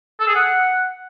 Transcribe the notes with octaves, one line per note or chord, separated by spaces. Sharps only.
A4
G#4
F#5